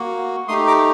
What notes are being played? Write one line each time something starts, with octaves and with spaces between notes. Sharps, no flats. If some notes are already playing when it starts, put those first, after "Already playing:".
Already playing: A#3 F#4
A3 D#4 G4 C6 D#6
A#5 D6